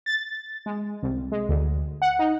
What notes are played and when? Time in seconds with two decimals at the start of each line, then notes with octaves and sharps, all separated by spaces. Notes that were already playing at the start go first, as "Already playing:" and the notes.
0.06 A6
0.66 G#3
1.02 C2
1.32 G#3
1.49 D2
2.02 F#5
2.19 D#4